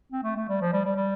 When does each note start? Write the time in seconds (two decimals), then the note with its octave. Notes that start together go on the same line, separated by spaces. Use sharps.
0.12 C4
0.23 A3
0.37 A3
0.49 G3
0.61 F3
0.73 G3
0.85 G3
0.96 G3